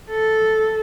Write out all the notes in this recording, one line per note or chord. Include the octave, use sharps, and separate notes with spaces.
A4